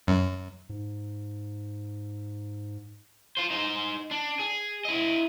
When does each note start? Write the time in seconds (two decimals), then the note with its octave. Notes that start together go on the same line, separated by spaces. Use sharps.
0.07 F#2
0.69 G#2
3.37 F4 C5
3.50 D#4 C5
4.11 D4
4.39 G#4
4.85 E4 D#5